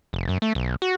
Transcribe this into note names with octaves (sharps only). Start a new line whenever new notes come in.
F1
F#2
A3
B1
F#4